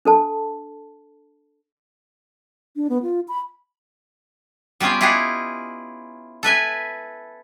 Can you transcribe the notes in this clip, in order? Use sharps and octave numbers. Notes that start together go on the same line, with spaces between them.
D4 A4 A5
D4
B3
F4
B5
G3 B3 C#4 F4 G4
E4 F4 G4 G#4 D#5 F#5
A4 B4 E5 G#5